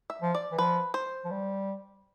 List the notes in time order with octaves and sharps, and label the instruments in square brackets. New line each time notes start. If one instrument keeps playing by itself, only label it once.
[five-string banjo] E5
[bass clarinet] F3
[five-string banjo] D5
[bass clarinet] E3
[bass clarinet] F3 [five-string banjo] B4
[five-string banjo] C5
[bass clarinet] F3
G3